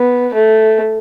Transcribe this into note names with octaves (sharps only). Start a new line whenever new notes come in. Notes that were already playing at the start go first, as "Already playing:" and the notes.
Already playing: B3
A3